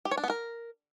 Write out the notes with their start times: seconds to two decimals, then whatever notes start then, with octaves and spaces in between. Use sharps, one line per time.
0.05 G4
0.11 C#5
0.17 D4
0.23 B3
0.30 A#4